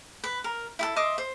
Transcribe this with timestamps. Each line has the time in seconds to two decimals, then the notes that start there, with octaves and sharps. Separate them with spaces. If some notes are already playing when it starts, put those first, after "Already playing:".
0.24 B4
0.44 A#4
0.79 E4 G#4 A4
0.96 D#5 E5 C6 D6
1.18 C5